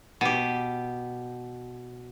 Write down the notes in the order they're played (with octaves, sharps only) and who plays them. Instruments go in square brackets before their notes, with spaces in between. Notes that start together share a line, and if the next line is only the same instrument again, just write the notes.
[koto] B2 G4